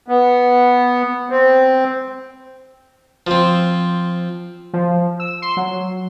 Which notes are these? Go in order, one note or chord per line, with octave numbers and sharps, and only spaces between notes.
B3
C4
F3 C4
F3
E6
C6
F#3